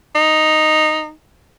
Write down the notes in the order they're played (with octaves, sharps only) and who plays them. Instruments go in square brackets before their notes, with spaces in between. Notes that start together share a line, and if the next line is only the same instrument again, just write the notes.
[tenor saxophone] D#4